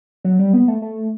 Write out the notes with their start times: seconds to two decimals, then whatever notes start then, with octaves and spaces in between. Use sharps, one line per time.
0.25 F#3
0.39 G3
0.53 B3
0.68 A3
0.82 A3